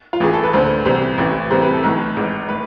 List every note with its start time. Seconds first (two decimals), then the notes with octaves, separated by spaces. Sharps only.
0.13 F4
0.20 A1 A2 E3 G#4
0.33 A4
0.43 B4
0.53 D2 D3 C5
0.85 C2 C3 E3 C5
1.18 A1 A2 E3
1.51 C2 C3 E3 C5
1.62 B4
1.73 A4
1.83 B1 A2 E3
2.17 G#1 G#2 E3
2.49 A2 B4